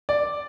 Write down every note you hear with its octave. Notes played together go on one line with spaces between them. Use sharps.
D5